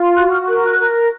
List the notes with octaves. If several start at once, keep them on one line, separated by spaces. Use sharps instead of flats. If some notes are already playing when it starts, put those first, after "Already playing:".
Already playing: F4
F#4 F#6
F6
A#4 F#6
F#6
A#4